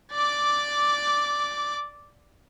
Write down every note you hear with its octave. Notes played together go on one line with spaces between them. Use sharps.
D5 D6